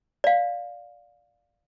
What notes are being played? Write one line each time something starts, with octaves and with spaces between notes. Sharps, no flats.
D5 F5